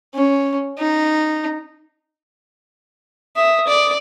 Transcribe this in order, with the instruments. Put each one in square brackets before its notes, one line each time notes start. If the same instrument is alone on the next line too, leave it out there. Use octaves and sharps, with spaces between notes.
[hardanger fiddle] C#4
D#4
[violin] E5 [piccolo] D#6
[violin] D5